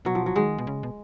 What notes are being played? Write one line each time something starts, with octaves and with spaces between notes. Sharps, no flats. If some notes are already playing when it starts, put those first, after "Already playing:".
B2 F#3
F3
F#3
D#3 G#3
B2
C#3
B2